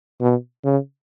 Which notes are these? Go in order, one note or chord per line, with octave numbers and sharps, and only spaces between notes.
B2
C#3